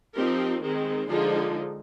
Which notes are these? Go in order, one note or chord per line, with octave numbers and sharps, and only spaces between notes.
F3 C4 D#4 G4 A#4
D#3 G#3 C4
D3 F3 G#3 D#4 F4 G#4